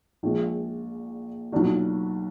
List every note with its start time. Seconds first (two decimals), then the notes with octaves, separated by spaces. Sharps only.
0.23 A#1 A#2 G#3
1.52 B1 A#2 F#3 D4 F#4